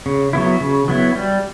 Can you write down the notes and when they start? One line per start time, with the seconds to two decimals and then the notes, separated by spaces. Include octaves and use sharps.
0.06 C#3
0.33 F#3 B3 E4
0.61 C#3
0.88 F#3 B3 E4
1.15 G3